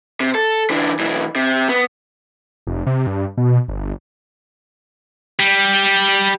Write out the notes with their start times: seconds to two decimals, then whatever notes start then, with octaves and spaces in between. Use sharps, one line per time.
0.20 C3
0.35 A4
0.70 D3 E3
0.99 B1 E3
1.35 C3
1.69 B3
2.67 F1
2.87 C3
3.07 G2
3.37 B2
3.68 G1
5.40 G3